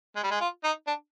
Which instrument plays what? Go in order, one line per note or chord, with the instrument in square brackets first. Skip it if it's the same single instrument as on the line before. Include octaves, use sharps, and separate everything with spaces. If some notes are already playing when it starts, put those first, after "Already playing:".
[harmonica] G#3
G3
G#3
F4
D#4
D4